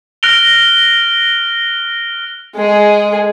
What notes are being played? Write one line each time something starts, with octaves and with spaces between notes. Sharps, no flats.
F6 F#6 A#6 D7 F7 G7
G#3 G#4